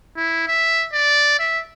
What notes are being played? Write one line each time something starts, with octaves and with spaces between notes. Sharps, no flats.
E4
E5
D5
E5